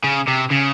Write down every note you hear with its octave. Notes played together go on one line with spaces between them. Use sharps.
C#3
C3
C#3